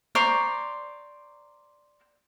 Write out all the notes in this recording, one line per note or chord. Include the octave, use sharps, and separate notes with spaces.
C5 D5 A#5 C#6